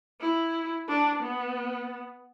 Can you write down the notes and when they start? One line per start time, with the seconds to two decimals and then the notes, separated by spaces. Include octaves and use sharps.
0.21 E4
0.88 D4
1.23 B3